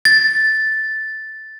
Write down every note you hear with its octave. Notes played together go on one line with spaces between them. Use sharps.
A6